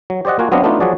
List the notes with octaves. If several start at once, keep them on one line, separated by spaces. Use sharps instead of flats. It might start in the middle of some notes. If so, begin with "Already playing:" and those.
F#3
G4 C5 D5 D#5 F#5
A#3 F4 F#4 G#5
F#3 B3 C4 D4 D#5 F5
A3 B3 D4 D#4 F4
F3 F#3 F#4 G#4 D5